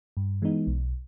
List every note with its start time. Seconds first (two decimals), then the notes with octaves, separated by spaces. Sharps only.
0.17 G2
0.42 E3 G#3 B3 D#4
0.67 B1